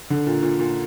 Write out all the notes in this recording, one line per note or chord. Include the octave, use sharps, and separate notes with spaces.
D3
A#2
A#2
A#2